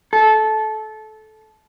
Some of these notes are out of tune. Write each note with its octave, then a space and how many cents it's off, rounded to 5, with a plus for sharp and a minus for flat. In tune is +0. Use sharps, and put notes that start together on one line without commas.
A4 -20